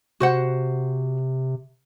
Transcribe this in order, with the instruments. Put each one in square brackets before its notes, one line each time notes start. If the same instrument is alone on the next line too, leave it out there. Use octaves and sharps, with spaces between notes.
[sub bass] C3 [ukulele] F#4 C5 F#5